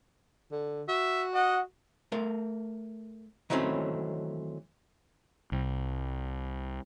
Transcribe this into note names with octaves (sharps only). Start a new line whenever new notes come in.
D3
F#4 E5
D#5 F#5
A3 A#4 C6
D#3 E3 F#3 A3 C4 C#4
C2